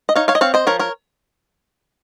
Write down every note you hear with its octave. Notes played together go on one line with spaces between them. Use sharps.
D#5
D#4 C#5 F5
C#5 F5
D#5
C4 C#5 F5
C5 D#5
F3 A#4 C#5
A#4 C#5